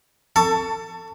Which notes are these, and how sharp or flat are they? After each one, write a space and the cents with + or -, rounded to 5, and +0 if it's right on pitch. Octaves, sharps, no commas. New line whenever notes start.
A4 +25 A5 +15 C#6 +20